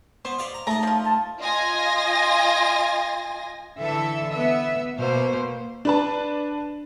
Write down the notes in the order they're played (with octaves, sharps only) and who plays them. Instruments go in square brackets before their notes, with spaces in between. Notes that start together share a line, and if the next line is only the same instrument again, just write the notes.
[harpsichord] B3 [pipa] C5
[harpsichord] C#5 D5 F5
A#5
[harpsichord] A3 D#4 [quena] A5 [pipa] A#5
[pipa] F3 F4
[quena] A5
[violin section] F4 D#5 G#5 A#6
[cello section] D3 E3 A4 E5
B3 E5
B2 A#3 C5
[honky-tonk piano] D4 B4 A5